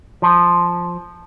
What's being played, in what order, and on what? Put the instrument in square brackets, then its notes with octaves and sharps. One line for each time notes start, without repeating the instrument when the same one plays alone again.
[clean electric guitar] F3